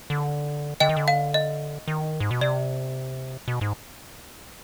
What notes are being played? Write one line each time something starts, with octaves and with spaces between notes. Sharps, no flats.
D3
D3 D#5 G5
D#3
D3
F5
D#5
D#3
G#2
B2
C3 D5
B2
G#2